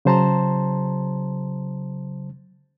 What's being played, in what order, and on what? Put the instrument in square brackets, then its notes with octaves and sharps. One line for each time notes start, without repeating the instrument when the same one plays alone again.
[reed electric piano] C#3 F#3 C5 A5 A#5 C6